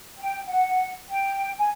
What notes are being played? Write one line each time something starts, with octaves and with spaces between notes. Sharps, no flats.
G5
F#5
G5
G#5